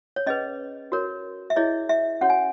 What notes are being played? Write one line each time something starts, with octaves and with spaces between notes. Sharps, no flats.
C#5
C#4 G#4 B4 D#5
F#4 A#4 C#5
E5
E4 G#4 C#5 D#5
E5
C#4 F#4 C#5 F#5
G#5